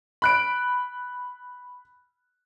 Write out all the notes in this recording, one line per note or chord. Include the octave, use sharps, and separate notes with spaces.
B5 F#6 D7